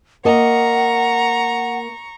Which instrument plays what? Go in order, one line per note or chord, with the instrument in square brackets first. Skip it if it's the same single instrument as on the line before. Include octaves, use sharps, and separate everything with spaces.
[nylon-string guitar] A#3 D#5 [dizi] F#5 [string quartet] A#5 C#6